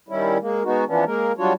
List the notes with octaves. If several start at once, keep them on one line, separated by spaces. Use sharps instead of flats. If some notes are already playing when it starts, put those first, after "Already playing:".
D#3 G3 C#4 E4
G#3 A#3
G#3 B3 D#4 F#4
E3 F3 B3 C#4 D4
G#3 A#3 A#4
F#3 G3 D4 F4 F#4 C#5